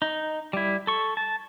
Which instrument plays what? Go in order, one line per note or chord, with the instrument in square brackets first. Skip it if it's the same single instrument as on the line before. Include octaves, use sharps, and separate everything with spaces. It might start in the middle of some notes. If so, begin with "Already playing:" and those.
[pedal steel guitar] D#4
G3 E4
A4 C#6
A5